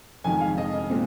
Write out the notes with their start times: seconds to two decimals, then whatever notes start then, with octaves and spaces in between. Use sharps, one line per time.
0.24 F1 F2 D#3 G#3 G#5
0.41 F5
0.58 D#5
0.90 A#2 G#3 C4